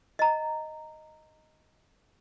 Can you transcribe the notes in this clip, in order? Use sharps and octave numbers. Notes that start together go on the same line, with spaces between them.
D#5 A#5